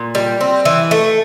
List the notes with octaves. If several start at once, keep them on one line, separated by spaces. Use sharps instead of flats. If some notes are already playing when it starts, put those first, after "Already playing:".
Already playing: A#2
G3
C4
E3
A3